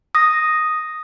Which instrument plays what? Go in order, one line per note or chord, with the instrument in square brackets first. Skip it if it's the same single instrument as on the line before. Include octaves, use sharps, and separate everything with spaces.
[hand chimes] D#6 A#6